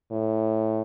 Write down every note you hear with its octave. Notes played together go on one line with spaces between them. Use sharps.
A2